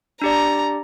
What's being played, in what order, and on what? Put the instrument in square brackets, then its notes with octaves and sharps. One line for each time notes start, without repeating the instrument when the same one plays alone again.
[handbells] D4 G4 D5 [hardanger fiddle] A#5